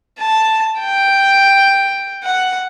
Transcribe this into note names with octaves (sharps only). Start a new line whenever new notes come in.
A5
G5
F#5